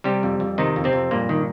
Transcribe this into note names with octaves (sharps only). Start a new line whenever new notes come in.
C3 G3 G4
F2
F2
C3 D#3 D#4
F2
C3 C4
F2
G2 A#2 A#3
D#3